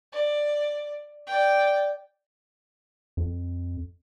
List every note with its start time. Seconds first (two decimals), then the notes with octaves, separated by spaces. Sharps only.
0.12 D5
1.27 D5 G5
3.17 F2